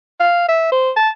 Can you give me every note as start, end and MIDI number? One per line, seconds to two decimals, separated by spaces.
0.20 0.46 77
0.49 0.68 76
0.72 0.91 72
0.97 1.09 81